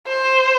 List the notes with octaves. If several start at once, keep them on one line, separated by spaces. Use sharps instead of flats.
C5